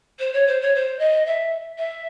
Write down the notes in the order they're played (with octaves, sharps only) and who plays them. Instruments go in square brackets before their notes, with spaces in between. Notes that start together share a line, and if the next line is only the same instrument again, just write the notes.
[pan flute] C5
C#5
C5
C#5
C5
D#5
E5
E5